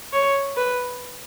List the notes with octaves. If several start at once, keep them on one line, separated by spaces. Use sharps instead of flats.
C#5
B4